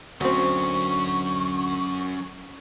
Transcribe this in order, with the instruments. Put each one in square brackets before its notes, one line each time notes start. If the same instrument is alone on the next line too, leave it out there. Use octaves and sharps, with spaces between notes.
[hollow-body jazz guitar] D2 C4 [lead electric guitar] F#3 C#4 [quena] C#6